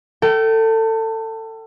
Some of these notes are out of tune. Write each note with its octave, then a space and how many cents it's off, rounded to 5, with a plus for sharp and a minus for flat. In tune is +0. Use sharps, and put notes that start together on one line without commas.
A4 +25 G5 -30